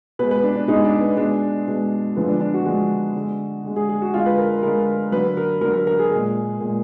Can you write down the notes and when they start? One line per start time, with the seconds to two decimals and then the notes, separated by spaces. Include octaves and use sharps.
0.19 B2 B4
0.22 G#3
0.31 B4
0.44 D4
0.56 D4
0.67 B2 G#3 D#4
0.84 D4
1.00 B3
1.17 B2 G#3 D4
1.67 B2 G#3
2.16 D3 F3 G#3 B3
2.28 D4
2.40 D4
2.54 F#4
2.65 D3 F3 G#3 F#4
3.15 D3 G#3
3.64 D3 G#3
3.76 G#4
3.89 G#4
4.02 F#4
4.14 D3 G#3 F4
4.26 B4
4.38 A#4
4.50 A#4
4.63 D3 G#3 A#4
5.12 D3 F#3 B4
5.37 A#4
5.61 D3 F#3 A#4
5.74 A#4
5.87 A#4
5.99 G#4
6.11 A#2 G#3
6.60 A#2 G#3